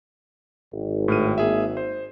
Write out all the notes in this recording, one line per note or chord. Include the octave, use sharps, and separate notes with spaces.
G#1
A2 F6 D#7
A#3 G#4 E5
C5